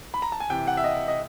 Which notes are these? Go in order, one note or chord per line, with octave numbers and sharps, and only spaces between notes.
B5
A#5
A5
G#5
C3 E3 G5
F#5
E5
D#5
D#5